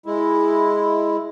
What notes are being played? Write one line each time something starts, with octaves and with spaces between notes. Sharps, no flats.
G#3 E4